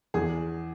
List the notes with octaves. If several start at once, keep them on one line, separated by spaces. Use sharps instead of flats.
E2 G#4